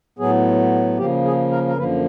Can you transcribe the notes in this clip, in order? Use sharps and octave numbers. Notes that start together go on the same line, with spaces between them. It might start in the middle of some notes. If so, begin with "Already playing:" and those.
A2 F#3 B3 G#4
C#3 F3 A#3 G4
G#4
A#4
A#4
F#2 D3 F3 A#3 B4